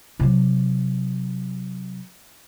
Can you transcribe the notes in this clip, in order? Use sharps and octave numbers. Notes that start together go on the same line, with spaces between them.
C3 F#3